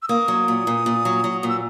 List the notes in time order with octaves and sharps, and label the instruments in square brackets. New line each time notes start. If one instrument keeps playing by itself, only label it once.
[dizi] E6
[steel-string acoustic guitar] A#3 [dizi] D#6
[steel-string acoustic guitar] F#3
A#2
A#2
A#2
F#3
F#3
[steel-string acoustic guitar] A#2 [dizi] D#6
[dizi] E6